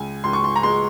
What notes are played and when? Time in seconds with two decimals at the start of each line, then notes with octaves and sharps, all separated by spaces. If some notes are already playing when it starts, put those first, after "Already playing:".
Already playing: C#2 G#5
0.24 C#2 C6
0.33 C#6
0.44 C6
0.56 A#5
0.63 G#3 C6